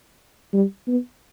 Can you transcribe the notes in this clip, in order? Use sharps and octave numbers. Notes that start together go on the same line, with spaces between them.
G3
B3